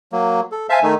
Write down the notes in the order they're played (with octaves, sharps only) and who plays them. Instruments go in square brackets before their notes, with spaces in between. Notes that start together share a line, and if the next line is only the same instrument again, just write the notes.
[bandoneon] F#3 A#3
A4
[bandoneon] C5 F5 A5 [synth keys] E5 G#5
[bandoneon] D#3 A3 D#4